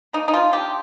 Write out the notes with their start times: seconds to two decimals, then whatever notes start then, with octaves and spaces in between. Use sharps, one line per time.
0.13 A#3 D#4
0.28 D#4
0.34 F3 F4
0.53 D4 G4